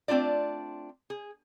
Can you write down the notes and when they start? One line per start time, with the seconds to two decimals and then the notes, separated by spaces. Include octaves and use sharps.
0.08 A3 C4 D4 F4 D5
1.10 G#4